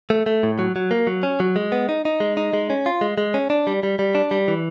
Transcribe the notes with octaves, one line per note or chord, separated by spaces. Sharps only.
A3
A3
A2
F#3
F#3
A#3
F#3
C#4
F#3
G#3
B3
D#4
D#4
G#3
D#4
G#3
C#4
F4
G#3
G#3
C#4
D4
G3
G3
G3
D4
G3
E3